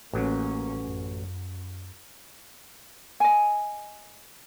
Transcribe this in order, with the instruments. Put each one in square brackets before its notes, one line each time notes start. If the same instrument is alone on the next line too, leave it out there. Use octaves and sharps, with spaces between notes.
[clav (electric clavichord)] A1 F#3 [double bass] A#3 C#4
[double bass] F#2
[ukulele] D#5 G#5